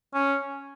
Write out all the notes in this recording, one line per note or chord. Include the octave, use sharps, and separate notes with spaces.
C#4